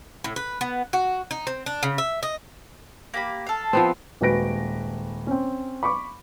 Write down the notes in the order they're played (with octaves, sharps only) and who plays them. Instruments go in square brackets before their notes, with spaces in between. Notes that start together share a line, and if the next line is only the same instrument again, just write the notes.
[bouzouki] A2
B4
B3
F#4
D#4
C4
D4
C#3
E5
D#5
[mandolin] A#3 G4 B5
A4 F5
[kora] F3 B3 C4
[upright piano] D#1 G#3 F#4 B4 A#6 D7
C4 C#4
B5 C#6 D6